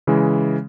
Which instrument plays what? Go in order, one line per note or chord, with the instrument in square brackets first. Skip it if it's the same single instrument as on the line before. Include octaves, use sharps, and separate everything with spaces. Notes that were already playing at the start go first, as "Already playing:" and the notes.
[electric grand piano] C#3 E3 G#3